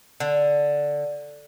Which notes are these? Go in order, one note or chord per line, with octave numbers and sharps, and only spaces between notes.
D3